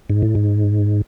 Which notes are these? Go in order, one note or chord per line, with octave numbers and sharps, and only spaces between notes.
G#2
A2
G#2